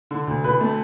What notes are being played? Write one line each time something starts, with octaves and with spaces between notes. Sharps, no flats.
D3
D2
D2 B4
A3